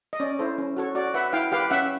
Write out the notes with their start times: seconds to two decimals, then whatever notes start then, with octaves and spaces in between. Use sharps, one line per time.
0.13 D#5
0.20 C#4 D5
0.39 E4 A4 C5
0.58 C#4
0.77 F#4 A4 C#5
0.95 F#4 D5
1.14 B4 E5 F#5
1.33 E4 F5 G5
1.52 G4 B4 F5 G5
1.70 C#4 E5 F#5